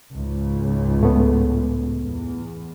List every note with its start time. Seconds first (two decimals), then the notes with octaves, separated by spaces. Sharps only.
0.12 C#2 G#2
1.01 A2 A3 B3
2.01 E2